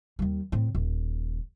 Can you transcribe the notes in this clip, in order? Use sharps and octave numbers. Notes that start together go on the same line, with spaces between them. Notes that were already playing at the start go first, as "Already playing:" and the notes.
D#2 G3
A2 C4
D#1